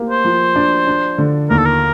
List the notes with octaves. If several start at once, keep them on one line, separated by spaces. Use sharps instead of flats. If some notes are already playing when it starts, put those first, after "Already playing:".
Already playing: A#3 G4
C5
F3
D4
D4
D3
D#2 A#4
A4
A#4